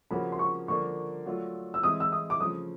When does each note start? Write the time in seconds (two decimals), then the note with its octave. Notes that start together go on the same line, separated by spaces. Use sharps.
0.11 C#3 F3 A#3 C#4 F#4 B5
0.32 C6
0.39 C#6
0.68 D3 F3 A#3 D4 C#6
1.26 F#3 A3 D4 F4
1.74 E6
1.83 E3 G#3 C4 E4 D#6
2.00 E6
2.12 D#6
2.30 D6
2.40 C#3 F3 A3 D#6